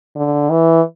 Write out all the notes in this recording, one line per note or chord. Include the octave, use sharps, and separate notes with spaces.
D3
E3